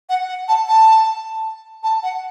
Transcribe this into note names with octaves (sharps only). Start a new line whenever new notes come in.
F#5
F#5
A5
A5
A5
F#5